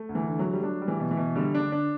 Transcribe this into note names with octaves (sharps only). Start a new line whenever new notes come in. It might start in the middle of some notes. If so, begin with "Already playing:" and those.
Already playing: A3
D2
E3
D3
F#3
A3
G3
F#3 D4
G3
E3
B2
E3
B2
D3 G3
D3 D4
D4